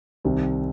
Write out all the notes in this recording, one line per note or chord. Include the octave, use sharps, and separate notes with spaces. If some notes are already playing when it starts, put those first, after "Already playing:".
C2 C3 D#3 C4